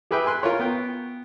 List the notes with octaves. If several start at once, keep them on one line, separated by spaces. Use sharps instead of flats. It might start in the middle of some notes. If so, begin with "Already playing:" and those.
G4 G#4 B4 E5 G5
G#5 C6 F#6
F4 A#4 C#5
B3 G5